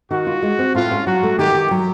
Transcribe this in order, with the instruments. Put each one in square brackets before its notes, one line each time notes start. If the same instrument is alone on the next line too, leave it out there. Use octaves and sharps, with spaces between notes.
[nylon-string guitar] D#3 [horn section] F#4
[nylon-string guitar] F4
G#3
C4
[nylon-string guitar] A2 [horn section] F4
[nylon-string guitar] C#4
[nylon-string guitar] F#3 [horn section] F#4
[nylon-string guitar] A3
[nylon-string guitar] D#3 [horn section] G4
[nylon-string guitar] D#3
F#3